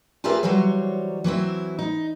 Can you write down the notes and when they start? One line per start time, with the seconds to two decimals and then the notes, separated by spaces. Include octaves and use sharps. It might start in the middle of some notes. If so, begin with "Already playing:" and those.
0.24 F4 G4 G#4 A#4 B4 E5
0.43 E3 F#3 G3 C5 C#5
1.24 E3 F#3 C4 E4
1.79 D#4